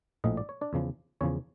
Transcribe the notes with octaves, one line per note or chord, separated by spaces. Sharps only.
A#1 A2 F3 D#5
D5
C#5
D4 D5
E2 C#3 F3
E2 C#3 F3 C#4 C#5